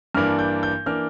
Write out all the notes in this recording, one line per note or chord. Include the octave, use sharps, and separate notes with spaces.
G2 E3 A#3 D4 F6
G6
G6
E3 A#3 D4 F6